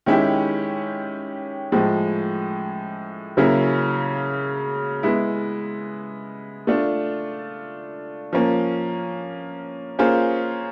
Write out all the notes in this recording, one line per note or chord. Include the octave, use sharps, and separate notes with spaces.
D#3 G#3 C#4 E4 G4
A2 F3 G#3
C#3 F#3 A#3 C#4 E4
G#3 B3 E4
A3 D4 F4
F3 A#3 C#4
A#3 C#4 F4 G#4 C5